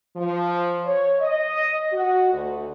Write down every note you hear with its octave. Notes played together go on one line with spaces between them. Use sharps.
F3
C#5
D#5
F#4
D2